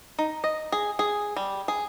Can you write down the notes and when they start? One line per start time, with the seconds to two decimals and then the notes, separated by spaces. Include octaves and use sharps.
0.19 D#4
0.44 D#5
0.72 G#4
0.99 G#4
1.37 G3
1.68 G#4